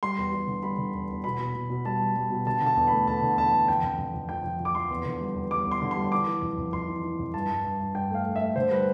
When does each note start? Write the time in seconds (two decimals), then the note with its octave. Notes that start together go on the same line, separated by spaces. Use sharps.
0.03 G3 C6
0.18 E2
0.32 G3
0.48 D3
0.63 G3 B5
0.78 D3
0.94 E2
1.10 E2
1.24 B2 B5
1.39 B2
1.55 B2
1.70 B2
1.85 G3 A5
2.00 G3
2.16 G3
2.30 B2
2.46 D3 A5
2.61 D3
2.66 A5
2.76 E2
2.87 A3 B5
3.07 E2 A5
3.23 D3
3.37 E2 A5
3.53 D3
3.68 F2 G5
3.83 F2
3.98 F2
4.14 F2
4.29 F3 G5
4.44 F2
4.60 F2
4.65 D6
4.75 F3 C6
4.90 E2
5.06 D3
5.21 G3
5.36 E2
5.51 G3 D6
5.66 E2
5.71 C6
5.82 D3
5.91 C6
5.97 G3
6.12 E3 D6
6.27 E3
6.42 F2
6.57 F2
6.73 F2 C6
6.88 E3
7.03 E3
7.19 F2
7.34 G2 A5
7.50 G2
7.64 G2
7.80 G2
7.95 G2 G5
8.11 A3 F5
8.25 A3
8.36 A3 E5
8.56 D3 C5
8.71 G3 B4